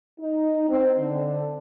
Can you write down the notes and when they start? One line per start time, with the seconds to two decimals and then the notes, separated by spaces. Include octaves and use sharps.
0.20 D#4
0.69 C4
0.99 D3